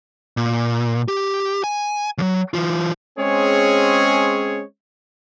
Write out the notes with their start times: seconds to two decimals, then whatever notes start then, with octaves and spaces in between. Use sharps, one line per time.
0.37 A#2
1.08 G4
1.64 G#5
2.18 D#2 F#3
2.54 E3 F4
3.18 G#3 C4 C#4 G#4 C#5